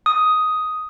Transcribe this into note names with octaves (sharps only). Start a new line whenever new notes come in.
D#6